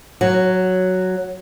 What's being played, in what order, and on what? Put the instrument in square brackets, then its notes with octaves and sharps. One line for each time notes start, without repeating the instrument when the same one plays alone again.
[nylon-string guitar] F#3